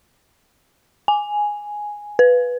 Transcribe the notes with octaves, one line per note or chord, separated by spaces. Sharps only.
G#5
B4